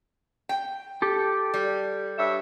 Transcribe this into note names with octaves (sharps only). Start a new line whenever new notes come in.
G5
G4 A4
G3
G2 C#5 E5